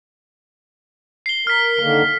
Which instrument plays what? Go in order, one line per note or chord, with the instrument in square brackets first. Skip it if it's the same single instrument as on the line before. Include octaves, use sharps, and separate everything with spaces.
[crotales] C7 G7
[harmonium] A#4 [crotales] F6 B6
[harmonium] D3 D#3 A#3